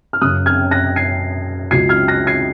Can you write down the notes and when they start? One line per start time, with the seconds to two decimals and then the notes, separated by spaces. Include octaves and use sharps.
0.13 F6
0.21 F#2 C#3 F#3 D#6 F#6
0.46 F6 G#6
0.71 F#6 A#6
0.96 G#6 C7
1.71 C#2 C#3 F#3 G#6 C7
1.89 F6 G#6
2.08 F#6 A#6
2.27 G#6 C7